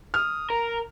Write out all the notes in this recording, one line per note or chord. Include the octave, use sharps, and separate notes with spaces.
D#6 F6
A#4 A#5